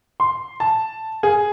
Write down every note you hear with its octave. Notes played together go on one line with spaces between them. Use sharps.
C6
A5
G#4